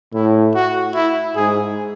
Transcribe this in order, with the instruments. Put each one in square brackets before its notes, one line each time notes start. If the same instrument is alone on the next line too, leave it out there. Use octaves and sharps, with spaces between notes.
[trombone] A2 [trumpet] E4
[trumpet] F#4
E4
[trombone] G#2 [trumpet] G#4